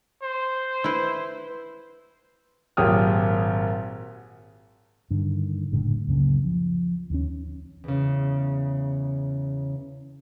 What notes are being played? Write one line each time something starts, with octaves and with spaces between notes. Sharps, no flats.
C5
E4 B4
G#1 A#2 F#3 G4 D#6 F6
G2 D3 D#3
F#1 A2 D3 G#3
C#2 F#2 C#3 A#3
F3
D#2 D#3 C#4
E2 C#3